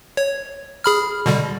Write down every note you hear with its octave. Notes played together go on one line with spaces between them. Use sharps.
C#5
G#4 B5 F6
B2 D3 G3